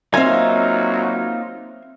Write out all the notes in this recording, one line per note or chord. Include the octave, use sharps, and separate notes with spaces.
F#3 A#3 C4 D#4 F4 E5 G#5